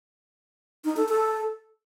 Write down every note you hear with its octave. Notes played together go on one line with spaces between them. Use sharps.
D#4
A4
A4